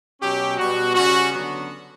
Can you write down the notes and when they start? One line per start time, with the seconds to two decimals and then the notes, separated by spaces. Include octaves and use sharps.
0.20 B2 F#3 C#4 G4
0.58 B2 G3 B3 F#4
0.94 C#3 G3 C#4 F#4
1.32 D3 F#3 B3